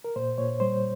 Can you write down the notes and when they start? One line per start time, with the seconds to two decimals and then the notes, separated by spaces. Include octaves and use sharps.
0.04 A#4
0.16 A#2 C5
0.38 A#2 C#5
0.60 G3 C5